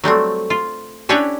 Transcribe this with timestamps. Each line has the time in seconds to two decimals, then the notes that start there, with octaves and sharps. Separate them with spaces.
0.04 F#3 G3 A3 C4
0.50 F4
1.09 C#4 D4 E4 G4 B4 C#5